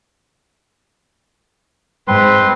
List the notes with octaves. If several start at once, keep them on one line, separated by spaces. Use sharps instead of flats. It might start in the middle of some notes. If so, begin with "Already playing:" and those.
G#2 C4 B4 C6